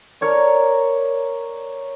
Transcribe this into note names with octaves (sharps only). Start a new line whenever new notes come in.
A#4 C#5 D5